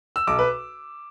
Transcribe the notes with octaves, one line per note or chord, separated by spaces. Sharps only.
E6
B1 D6
B4